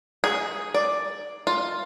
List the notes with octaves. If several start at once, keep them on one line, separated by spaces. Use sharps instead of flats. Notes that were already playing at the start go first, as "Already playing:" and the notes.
G#4
D5
F4